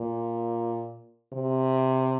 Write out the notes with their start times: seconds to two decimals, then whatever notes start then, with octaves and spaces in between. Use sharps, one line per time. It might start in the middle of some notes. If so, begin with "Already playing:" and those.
Already playing: A#2
1.33 C3